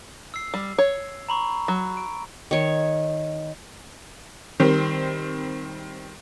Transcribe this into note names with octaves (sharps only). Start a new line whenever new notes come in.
E6 C7
G3
C#5
A#5 B5 C#6
F#3
D7
D#3 C#5
D#3 G3 C4